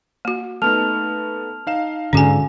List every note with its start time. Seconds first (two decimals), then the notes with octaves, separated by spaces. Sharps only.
0.25 A#3 F#4
0.62 A3 B3 D#4 A5 F6 F7
1.67 D#4 F5 E7
2.13 G#2 D3 C#4 F#4 G#5